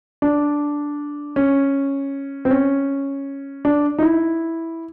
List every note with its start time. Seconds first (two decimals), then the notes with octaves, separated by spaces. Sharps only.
0.22 D4
1.36 C#4
2.45 C4
2.51 C#4
3.65 D4
3.99 D#4
4.03 E4